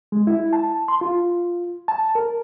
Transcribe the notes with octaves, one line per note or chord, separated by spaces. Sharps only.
G#3
E4
A5
C6
F4
A5
A#4